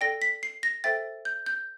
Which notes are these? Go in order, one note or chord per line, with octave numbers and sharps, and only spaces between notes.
A4 D5 G5 A#6
B6
C7
A#6
A4 C5 E5 G5 A6
G6
G6